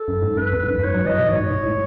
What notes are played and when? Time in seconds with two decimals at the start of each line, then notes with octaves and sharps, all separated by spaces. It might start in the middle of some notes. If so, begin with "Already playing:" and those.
Already playing: A4
0.08 F#2
0.22 G#2
0.37 F#2 B4
0.53 E2
0.63 G#2
0.69 F#2
0.83 G#2 C#5
0.94 F#3
1.06 E3 D#5
1.18 B2
1.29 G#2 C#5
1.40 G#2
1.52 G#2
1.63 A2